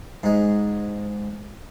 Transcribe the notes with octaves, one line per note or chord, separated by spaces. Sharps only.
G#2 G#3